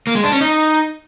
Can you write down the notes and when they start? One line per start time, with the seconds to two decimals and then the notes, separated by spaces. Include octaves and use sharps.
0.07 A#3
0.15 G#3
0.24 D4
0.32 C#4
0.41 D#4